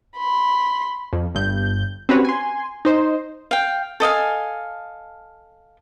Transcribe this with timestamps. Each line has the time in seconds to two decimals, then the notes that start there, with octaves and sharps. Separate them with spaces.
0.18 B5 C6
1.13 F2
1.35 G1 G2 G6
2.09 C4 C#4 F#4 G4 B4 C#5
2.25 G#5 C6
2.85 D#4 C5
3.51 F5 G5
4.00 A4 D#5 F5 G#5